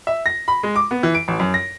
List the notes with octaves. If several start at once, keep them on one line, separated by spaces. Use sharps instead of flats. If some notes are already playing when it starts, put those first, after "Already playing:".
E5
A#6
B5
G#3
D6
B3
E3
D7
A1
F#2
A#6